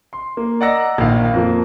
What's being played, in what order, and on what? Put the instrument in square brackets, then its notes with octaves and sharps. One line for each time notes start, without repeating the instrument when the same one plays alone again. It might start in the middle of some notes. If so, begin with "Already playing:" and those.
[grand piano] C6
A#3
D5 D#5 F#5 A#5 E6 A#6
A#1 D#3 F5
F2 F3 A#3